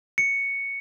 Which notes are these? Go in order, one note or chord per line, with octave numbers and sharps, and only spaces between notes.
C#7